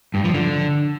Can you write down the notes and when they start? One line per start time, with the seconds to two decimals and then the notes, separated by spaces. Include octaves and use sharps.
0.14 G2
0.24 F3
0.34 D3